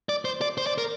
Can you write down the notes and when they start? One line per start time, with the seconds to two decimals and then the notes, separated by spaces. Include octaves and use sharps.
0.09 D5
0.25 C5
0.41 D5
0.58 C5
0.67 D5
0.78 A#4